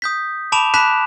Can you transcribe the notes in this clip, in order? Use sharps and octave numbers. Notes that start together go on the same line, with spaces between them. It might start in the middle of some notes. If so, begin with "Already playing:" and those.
D#6 G6 B6
A5 B5 D6 D7 E7 F7
A5 B5 D6 F#6 B6 E7